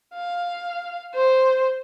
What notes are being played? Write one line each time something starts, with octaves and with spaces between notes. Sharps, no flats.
F5
C5